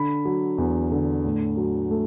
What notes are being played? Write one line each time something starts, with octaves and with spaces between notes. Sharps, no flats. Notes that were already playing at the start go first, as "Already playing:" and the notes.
Already playing: D3 B5
F#3
E2
D3
A2
F#3
A3